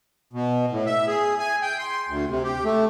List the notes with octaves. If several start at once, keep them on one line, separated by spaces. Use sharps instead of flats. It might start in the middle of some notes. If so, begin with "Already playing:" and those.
B2
A2
E5
G#4
G#5
G5
C6
D2
C3
G4
A3